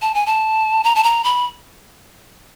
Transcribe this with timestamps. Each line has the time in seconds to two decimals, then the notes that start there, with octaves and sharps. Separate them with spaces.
0.02 A5
0.14 G#5
0.26 A5
0.84 A#5
0.95 A5
1.03 A#5
1.24 B5